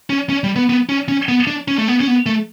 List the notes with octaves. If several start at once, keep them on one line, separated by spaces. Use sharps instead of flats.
C#4
C#4
G3
B3
B3
C#4
C#4
B3
D4
C#4
A3
B3
C#4
B3
A3